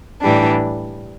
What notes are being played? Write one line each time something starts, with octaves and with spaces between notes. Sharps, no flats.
A2 E3 G3 D4